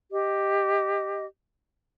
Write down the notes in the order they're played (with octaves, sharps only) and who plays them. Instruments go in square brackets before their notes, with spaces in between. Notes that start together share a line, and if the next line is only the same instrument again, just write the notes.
[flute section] G4 D#5